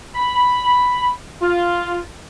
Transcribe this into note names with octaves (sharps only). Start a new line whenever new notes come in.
B5
F4